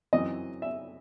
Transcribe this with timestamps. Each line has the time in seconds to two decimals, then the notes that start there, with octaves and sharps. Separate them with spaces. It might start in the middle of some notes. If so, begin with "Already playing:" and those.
0.13 F#2 E3 C4 D#5
0.62 E5